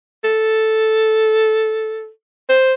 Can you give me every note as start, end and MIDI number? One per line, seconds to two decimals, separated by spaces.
0.24 2.10 69
2.50 2.74 72